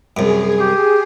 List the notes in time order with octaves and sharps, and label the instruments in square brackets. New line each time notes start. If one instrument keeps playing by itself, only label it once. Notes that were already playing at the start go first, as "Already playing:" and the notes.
[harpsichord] C2 F#2 [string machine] G#4
[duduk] G4